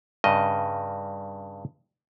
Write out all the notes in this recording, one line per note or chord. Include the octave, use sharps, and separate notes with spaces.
G2 C#3 D#5